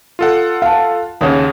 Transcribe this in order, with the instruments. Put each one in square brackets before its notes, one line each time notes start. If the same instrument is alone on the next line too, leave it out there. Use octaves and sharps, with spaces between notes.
[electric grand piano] F4 A4 F#5
[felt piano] F5 A5
[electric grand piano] D#2 C#3 [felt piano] C#5 F#5 D#6